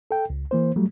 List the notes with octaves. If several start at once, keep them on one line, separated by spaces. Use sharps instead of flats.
A4 G5
C#2
E3 A#3 C5
F#3 G3 A3